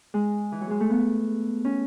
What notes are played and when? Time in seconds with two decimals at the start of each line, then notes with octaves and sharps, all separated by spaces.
0.14 G#3
0.52 E3
0.61 F#3
0.70 G#3
0.80 A3
0.90 B3
1.65 C#4